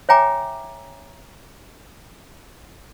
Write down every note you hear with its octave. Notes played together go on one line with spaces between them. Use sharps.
C#5 E5 G5 G#5 A#5 D6